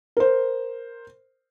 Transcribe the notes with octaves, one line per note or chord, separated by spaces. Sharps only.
A#4 C5